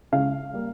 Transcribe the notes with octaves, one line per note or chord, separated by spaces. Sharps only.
C#2 C#3 G#3 F5
G3 A#3